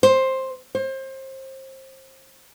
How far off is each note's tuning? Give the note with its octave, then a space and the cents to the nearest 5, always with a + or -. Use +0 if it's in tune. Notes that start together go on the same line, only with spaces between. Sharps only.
C5 +10
C5 +30